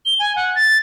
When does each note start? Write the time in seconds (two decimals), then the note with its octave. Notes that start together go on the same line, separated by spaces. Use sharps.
0.06 G7
0.19 G#5
0.36 F#5
0.55 A6